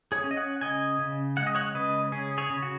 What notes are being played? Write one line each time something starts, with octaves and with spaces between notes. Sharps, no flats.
G#4 C#5
C#4
D#5
C#5 F#5
C#3 D#5 G#5
C#3
G#3 F#5
D#5
C#5 F#5
C#3 B4 D#5
C#4 G#4
G#4 C#5
C#3
F#4